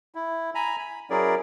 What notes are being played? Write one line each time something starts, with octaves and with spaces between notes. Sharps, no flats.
E4
G#5 A#5 B5
B5
F#3 C#4 E4 G#4 A#4 D5